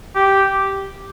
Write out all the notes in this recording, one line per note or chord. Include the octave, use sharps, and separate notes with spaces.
G4